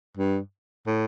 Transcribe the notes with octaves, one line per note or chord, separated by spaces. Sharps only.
G2
A2